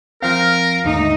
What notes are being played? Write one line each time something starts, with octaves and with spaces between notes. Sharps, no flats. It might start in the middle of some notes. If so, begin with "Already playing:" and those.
F3 C4 A#4 F5
D#2 G#2 D3 A3 D#4